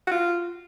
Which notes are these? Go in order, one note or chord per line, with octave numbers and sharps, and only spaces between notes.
F#4
F4